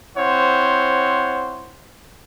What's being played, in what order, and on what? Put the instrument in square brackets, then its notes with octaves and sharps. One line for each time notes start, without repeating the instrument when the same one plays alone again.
[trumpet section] C4 E4 C5 C#5 F#5